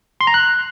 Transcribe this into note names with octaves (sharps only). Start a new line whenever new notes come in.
C6
A#5
F#6